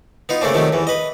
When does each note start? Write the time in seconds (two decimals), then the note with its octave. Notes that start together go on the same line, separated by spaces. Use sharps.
0.29 B3 D#4 F4
0.41 C#3 A3 A#3 C4 D4
0.54 C3 D#3 F3 F#3 A3
0.73 E2 E3
0.87 B4 D#5